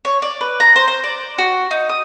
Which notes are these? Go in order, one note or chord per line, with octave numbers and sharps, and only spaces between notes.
C#5
D5
B4
A#5
C5
C5
D5
F#4
D#4
D#6